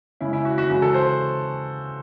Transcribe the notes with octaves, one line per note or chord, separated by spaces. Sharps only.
C#3 G#3 E4
E4
F#4
F#4
C#3 E3 G#3 F#4
A4
C5